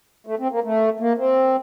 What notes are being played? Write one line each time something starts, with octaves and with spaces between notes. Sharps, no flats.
A3
C4
A#3
A3
A#3
C4